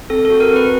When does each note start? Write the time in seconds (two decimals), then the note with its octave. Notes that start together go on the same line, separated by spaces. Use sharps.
0.10 C4 A4
0.25 A4
0.30 F#4
0.40 A#4
0.50 C4
0.56 B4